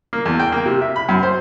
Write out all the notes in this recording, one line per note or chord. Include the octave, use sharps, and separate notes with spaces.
A#3
E2
G5
A#3
C3
E5
B5
F#2
C5